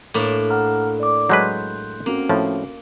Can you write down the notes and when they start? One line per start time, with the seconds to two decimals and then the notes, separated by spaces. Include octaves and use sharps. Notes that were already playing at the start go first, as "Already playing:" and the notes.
0.14 A2 A#3 D4
0.50 F#5 A#5 F6
1.00 D5 D6
1.30 F#3 G#3 B4 C6 F#6 G6
2.06 A#3 C4 C#4 F#4
2.29 A2 F3